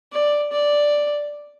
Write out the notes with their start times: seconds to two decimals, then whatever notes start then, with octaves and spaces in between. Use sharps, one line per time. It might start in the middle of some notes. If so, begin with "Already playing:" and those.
0.12 D5
0.52 D5